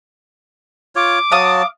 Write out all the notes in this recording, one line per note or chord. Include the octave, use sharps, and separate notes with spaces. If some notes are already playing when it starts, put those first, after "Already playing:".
F4 C#5 D6
F#3 F5 A5 D#6